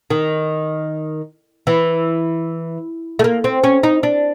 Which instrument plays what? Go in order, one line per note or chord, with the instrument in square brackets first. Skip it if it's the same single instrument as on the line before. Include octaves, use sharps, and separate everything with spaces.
[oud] D#3
E3
A3
A#3
C4
C#4
D#4
D4